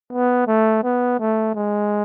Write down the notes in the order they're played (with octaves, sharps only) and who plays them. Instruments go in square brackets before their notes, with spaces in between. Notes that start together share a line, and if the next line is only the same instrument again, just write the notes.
[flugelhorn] B3
A3
B3
A3
G#3